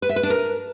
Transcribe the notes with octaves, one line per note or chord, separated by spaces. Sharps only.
B4
E5
B4
D4
A#4